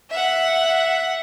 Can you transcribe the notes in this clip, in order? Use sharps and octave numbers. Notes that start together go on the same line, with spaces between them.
E5 F#5